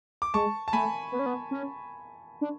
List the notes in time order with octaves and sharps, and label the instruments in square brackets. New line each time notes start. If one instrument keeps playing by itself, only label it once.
[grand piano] D6
[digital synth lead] G#3 [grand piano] A5 C#6
[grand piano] A5
[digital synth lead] A3 [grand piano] G#5 B5
[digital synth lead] B3
C#4
B3
C#4
D4